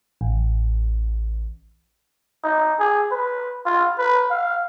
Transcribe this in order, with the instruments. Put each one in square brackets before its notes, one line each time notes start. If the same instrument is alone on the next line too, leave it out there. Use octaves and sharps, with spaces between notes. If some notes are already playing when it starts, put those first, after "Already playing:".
[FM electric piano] A1
[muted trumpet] D#4
G#4
B4
F4
B4
F5